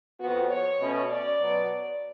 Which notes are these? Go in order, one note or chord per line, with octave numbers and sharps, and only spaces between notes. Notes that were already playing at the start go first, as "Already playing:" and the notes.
F2 F3 B3 F#4
C#5
B2 A3 C#4
D5
B2 F#3 B3